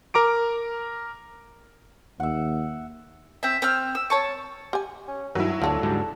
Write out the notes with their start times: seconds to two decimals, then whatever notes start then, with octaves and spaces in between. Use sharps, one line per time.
0.14 A#4 A#5 D6 D7
2.20 D#2 E5 F#5
3.43 C4 E5
3.62 C4 E6 F6
3.95 E6
4.10 C#5 A5 C#6
4.73 G4 G#5
5.08 C#4
5.35 C2 G2 F#3 E4
5.62 D2 F3 A3 D4 A4
5.83 G#2 D3 G3